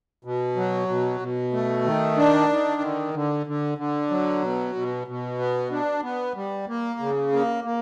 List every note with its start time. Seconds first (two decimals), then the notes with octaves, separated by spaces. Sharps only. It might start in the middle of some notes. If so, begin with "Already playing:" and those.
0.25 B2
0.56 F#3
0.88 B2
1.20 B2
1.53 A3
1.85 D#3
2.17 D4
2.50 D#3
2.81 D3
3.14 D3
3.46 D3
3.78 D3
4.10 F#3
4.42 B2
4.75 B2
5.07 B2
5.39 B3
5.71 D4
6.03 B3
6.36 G3
6.68 A#3
7.00 C#3
7.32 A#3
7.64 A#3